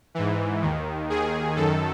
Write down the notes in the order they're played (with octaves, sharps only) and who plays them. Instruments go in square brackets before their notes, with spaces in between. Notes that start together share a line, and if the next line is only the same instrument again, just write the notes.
[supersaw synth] G#2 E3
D#2 D#3
D#2 D#3 G#4
F#2 D#3 A4